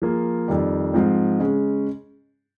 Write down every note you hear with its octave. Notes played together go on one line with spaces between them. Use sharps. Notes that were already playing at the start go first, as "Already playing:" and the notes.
F3 A#3 F4 G#4
F2 D#3 G3
G#2 F3 C4
C#3 G#3 C#4